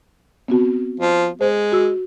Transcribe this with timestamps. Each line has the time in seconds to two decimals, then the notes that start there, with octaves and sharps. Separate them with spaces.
0.48 B3 C4 F#4
1.00 F3
1.41 G#3 C5
1.72 F#4 E6